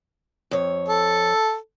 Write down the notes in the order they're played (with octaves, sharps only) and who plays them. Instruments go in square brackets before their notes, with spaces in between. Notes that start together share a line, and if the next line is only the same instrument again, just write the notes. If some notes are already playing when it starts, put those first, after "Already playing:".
[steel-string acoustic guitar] F2 C#5
[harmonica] A4